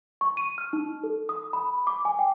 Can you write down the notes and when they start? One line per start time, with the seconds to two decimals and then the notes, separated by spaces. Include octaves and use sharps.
0.21 C#6
0.37 D#7
0.58 F6
0.73 D#4
1.04 A4
1.29 D#6
1.53 B5
1.87 D6
2.05 G#5
2.19 G5